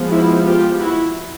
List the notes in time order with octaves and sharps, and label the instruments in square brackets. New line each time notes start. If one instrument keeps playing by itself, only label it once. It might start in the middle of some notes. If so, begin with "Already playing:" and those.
Already playing: [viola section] F3 G#3 B3
E4 F#4
F4 G4
E4 F#4